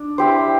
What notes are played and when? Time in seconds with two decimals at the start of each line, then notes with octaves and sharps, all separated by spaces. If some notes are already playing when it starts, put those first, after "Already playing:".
Already playing: D4
0.18 E4 G4 C5